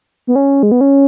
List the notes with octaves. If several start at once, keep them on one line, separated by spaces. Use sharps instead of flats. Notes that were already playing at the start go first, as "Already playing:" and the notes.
B3
C#4
G#3
B3
C#4